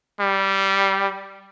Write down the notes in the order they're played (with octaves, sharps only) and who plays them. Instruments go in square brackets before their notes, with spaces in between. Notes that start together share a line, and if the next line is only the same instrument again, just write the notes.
[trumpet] G3